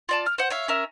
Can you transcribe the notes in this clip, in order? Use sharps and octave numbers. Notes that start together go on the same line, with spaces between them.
F4 D5 A5
F6
C5 F#5
C#5 E5 F5
C#4 A#4 E5